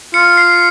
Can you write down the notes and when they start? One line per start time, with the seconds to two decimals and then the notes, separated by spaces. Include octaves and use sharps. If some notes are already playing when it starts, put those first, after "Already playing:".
0.14 F4 C#7
0.37 C7